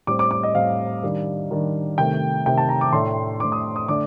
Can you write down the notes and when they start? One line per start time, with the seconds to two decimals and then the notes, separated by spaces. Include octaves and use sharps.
0.07 A2 G3 C4 D6
0.19 D6
0.31 D6
0.43 D#5
0.55 A2 G3 C4 F5
1.03 D#3 G3 D4
1.51 D#3 G3 D4
1.98 C3 D#3 A3 G5
2.45 C3 D#3 A3 G5
2.58 A5
2.69 A#5
2.81 D6
2.93 A2 A3 D4 C6
3.40 A2 A3 D4 D6
3.52 D#6
3.76 D#6
3.88 D3 A3 D4 D6